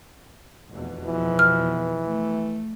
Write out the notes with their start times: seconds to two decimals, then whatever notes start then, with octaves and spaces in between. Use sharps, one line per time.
0.69 F1 E2 B2
1.06 E3 F3
1.39 F6
2.06 A3